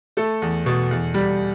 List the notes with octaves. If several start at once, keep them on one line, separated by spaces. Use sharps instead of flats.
A3 A4
E2
B2
E2
G3